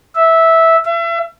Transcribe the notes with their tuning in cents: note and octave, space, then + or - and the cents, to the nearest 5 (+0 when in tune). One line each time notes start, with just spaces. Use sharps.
E5 -10
E5 +35